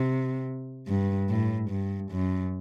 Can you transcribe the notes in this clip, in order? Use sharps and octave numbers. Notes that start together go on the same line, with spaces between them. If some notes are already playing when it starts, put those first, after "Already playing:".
Already playing: C3
G2
A2
G2
F#2